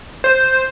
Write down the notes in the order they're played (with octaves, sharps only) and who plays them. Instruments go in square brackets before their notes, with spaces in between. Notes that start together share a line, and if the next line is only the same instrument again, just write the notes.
[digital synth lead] C5